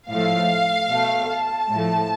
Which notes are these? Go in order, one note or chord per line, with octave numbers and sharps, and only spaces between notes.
A2 F3 A3 F5
B2 A3
A5
A2 F3 A3